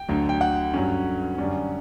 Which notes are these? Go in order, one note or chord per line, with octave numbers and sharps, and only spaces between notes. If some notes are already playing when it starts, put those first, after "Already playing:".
Already playing: G5
D2 D3 F#3
G5
F#5
G2 F#3 C#4
F#2 D3 G3 C#4